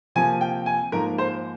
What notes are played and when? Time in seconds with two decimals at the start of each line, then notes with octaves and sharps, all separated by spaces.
0.15 C3 F3 A#3 G#5
0.41 G5
0.66 G#5
0.92 G#2 F3 A#3 A#4
1.18 C5